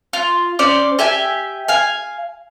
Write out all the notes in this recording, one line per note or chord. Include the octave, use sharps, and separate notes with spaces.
F4
C#4 C5 D5 D6
G4 E5 G#5
F5 G#5